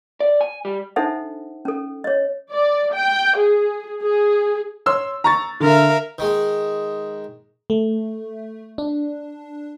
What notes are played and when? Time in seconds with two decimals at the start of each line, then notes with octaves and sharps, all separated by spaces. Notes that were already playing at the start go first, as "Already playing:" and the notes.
0.20 D5
0.41 G#5
0.65 G3
0.96 D4 D#4 A4 C5 E5 F#5
1.65 C#4 A4
2.04 C#5 D#5
2.51 D5
2.93 G5
3.37 G#4
4.02 G#4
4.86 C#5 C6 E6
5.24 A#5 C#6 A6
5.60 D3 A#4 E5 F5
6.18 D#3 G#3
7.70 A3
8.78 D4